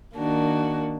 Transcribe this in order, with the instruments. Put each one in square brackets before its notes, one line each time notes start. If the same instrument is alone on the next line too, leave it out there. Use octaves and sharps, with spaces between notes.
[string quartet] D#3 A#3 D4 F#4